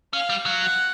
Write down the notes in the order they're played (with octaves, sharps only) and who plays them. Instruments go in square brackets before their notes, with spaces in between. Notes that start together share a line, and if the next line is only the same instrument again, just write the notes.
[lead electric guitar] C#4 [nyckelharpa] F5
[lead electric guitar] G3
F#3
[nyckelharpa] F#5